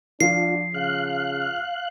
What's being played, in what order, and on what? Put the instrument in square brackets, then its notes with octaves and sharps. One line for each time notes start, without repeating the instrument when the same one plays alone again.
[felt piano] F3 [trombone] D4 [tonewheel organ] F4 [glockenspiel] C7
[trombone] C#3 [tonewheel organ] F5 F#6